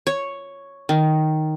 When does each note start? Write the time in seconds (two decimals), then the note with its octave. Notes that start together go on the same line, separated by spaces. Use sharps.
0.07 C#5
0.89 D#3